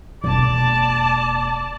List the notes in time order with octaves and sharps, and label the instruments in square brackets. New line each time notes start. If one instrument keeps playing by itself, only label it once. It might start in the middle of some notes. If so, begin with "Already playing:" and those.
[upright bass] E1 A#3 [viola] D5 A5